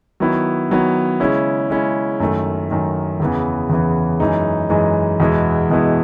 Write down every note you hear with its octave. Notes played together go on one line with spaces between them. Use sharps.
D#3 F#3 B3 E4
D#3 F#3 B3 E4
C#3 G#3 C#4 E4
C#3 G#3 C#4 E4
F#2 D#3 A3
F#2 D#3 A3
E2 C#3 E3 B3
E2 C#3 E3 B3
F#2 E3 G#3 D#4
F#2 E3 G#3 D#4
E2 B2 G#3 B3 E4
E2 B2 G#3 B3 E4